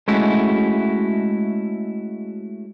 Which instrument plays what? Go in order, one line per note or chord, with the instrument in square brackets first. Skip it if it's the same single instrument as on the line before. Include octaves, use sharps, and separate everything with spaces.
[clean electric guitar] G#3 A3 C#4 E4 F#4